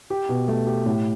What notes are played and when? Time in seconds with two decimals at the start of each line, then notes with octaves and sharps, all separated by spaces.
0.10 G4
0.29 B2
0.48 A3
0.67 G4
0.86 A2